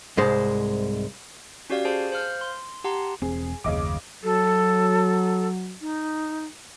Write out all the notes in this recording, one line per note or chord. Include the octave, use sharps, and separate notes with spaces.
C2 G#2 G#3 C5
C#4 F#4 G4 D5 F5
G#4 C5 G#5 A5
C5 F5 F6 G6
C6
G4 F#5 A5 A#5 C6
E1 C4 G#4
F#1 D#2 C#3 D#5 D6
F#3 A4
D#4